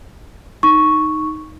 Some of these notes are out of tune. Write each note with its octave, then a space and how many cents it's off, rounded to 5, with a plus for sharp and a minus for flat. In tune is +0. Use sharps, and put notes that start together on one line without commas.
D#4 +0 C#6 +0